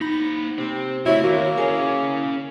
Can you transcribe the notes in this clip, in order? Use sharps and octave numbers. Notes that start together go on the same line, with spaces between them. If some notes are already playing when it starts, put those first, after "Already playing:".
A#3 D#4 B5 A#6
C3 C4
C#3 A3 E4 F#4 C#5 E5
D#2 A#3 F#4
C#4 E4 G#4 A#4 C#5 F5 G#5